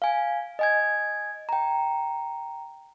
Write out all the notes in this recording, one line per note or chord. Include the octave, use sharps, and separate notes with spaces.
F5 G#5
D#5 G#5 G#6
G5 A#5